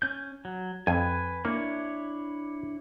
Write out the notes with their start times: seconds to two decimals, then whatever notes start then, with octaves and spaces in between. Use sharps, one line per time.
0.02 C#4 G6
0.45 F#3
0.87 F2 B4 G#5
1.45 A#3 D4 E4 C#5